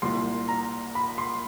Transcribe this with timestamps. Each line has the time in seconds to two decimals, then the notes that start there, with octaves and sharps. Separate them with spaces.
0.02 C2 A#2 G3 C6
0.48 A#5
0.95 B5
1.18 C6